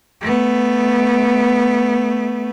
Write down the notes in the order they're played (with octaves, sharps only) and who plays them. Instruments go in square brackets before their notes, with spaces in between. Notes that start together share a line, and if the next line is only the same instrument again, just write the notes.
[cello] A3 B3